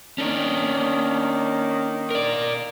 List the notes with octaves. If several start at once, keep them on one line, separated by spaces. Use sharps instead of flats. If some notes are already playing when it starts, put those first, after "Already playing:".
D#3 A#3 C#4 D4
A#4 D5